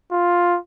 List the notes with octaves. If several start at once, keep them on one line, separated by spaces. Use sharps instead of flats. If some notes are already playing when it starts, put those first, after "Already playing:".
F4